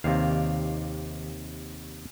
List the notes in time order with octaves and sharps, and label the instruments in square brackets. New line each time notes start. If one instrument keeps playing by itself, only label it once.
[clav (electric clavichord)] D#2 C3 [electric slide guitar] D#3 D5 F5